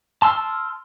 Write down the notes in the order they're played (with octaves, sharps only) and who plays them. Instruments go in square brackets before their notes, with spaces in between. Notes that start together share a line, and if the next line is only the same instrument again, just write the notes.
[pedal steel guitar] A5 C6 E6 F6